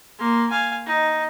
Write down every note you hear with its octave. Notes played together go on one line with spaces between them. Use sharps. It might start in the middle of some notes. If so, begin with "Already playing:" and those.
A#3 C6
F5 G#5
D#4